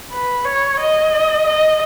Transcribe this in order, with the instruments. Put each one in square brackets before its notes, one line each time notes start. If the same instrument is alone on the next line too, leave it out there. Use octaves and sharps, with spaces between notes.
[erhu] B4
C#5
D#5
D#5